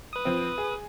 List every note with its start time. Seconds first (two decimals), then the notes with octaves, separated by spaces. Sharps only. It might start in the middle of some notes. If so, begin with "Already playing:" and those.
0.13 B4 D#6
0.25 F3 C4
0.58 G#4